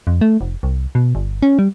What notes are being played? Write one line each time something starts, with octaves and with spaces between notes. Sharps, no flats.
F2
A3
F1
C2
B2
G1
C#4
G3